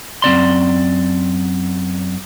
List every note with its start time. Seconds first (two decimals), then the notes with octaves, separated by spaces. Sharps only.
0.22 F#2 C4 D5 C6